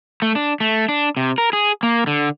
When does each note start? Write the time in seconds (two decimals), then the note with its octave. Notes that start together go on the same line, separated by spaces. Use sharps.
0.22 A3
0.35 D4
0.60 A3
0.89 D4
1.17 C3
1.38 A#4
1.53 G#4
1.83 A#3
2.07 D3